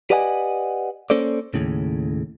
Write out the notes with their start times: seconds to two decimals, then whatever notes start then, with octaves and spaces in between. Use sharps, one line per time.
0.10 G4 B4 D5 D#5 F#5 G#5
1.10 A#3 C#4 A4 C5 D5
1.54 D#2 A2 C#3